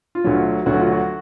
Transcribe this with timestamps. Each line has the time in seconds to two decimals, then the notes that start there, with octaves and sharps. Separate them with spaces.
0.15 F4
0.24 D2 D3 F#3
0.66 D2 D3 F#3 F#4
0.79 F4
0.92 F#4